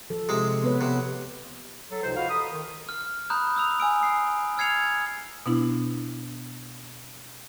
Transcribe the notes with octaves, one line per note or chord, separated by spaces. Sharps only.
F3 A4
C3 G#3
B3 B4 C#5
C3
F#3 A4
C#2 C3 F3 D#4 C5
F4 F#4 B4 D#5 F5
A4 A#5 B5 D#6
D#3
F6
A#5 B5 D#6 F#6 G6
D#6 E6 F7
G#5 E6 D7
D#6 C7
E6 F6 G#6 C7 C#7 F7
B2 B3 D4 E4